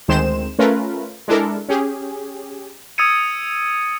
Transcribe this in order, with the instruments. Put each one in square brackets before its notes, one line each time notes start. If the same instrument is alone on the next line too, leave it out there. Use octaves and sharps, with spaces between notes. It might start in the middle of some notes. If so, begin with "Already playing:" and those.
[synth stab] D2 D#3 G#3 C4 C5 E7
A3 C#4 F4 A#4 B4
G#3 D4 E4 A4 A#4
C#4 G4 G#4
[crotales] D#6 E6 G#6 A6 C#7 D#7